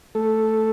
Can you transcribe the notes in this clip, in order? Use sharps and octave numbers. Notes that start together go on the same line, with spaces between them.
A3 A4